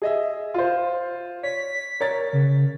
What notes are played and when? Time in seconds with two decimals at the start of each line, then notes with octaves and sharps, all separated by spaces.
0.02 G#4 D#5 E5
0.54 F4 C5
1.43 C#5 B6
2.01 A#4 C#5 A6
2.33 C#3